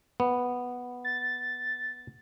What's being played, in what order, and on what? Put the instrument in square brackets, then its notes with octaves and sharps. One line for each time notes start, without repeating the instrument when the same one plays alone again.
[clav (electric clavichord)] B3
[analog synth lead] A6